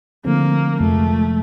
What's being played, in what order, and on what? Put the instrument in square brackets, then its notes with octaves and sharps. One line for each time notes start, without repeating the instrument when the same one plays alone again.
[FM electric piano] D3 F3 A3 C4 [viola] A#3
[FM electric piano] F2 C3 F3 G#3 [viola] A3